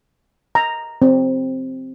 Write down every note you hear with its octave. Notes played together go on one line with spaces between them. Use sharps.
A#5
C4